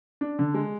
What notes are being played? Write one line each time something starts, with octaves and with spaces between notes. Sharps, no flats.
D4
D3
G#3